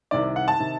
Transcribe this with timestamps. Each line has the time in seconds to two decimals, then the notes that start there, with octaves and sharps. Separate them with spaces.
0.11 C2 C3 D#3 D5
0.36 F#5
0.48 A5
0.60 C3 D#3